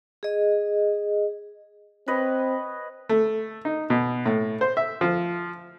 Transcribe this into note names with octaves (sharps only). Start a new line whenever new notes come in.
G#4 D#5
C4 B4 C#5 D#5
A3
D#4
B2
A2
C5
E5
F3